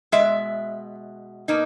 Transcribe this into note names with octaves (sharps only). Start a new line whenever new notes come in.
B2 G#3 E5
B2 A#3 D#4